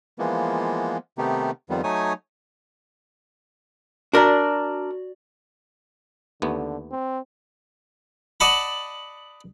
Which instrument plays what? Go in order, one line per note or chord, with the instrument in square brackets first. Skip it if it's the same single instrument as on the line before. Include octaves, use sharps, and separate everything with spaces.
[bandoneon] E3 F3 G#3 A#3 B3
C3 D#3 A3 B3 D#4 G4
F2 D#3 F3 G3 B3
F#3 A3 D#4 C#5 G#5 D#6
[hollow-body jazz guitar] D4 A#4 [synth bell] F#4 D5
[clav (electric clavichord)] D#2 A3 B3 [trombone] D3
[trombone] C4
[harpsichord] D5 D#5 F#5 A5 B5